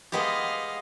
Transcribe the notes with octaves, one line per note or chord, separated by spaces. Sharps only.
G#3 B3 G4 D#5 F5